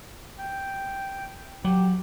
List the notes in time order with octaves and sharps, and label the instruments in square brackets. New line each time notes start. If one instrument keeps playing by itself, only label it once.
[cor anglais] G5
[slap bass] F#3 [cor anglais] G4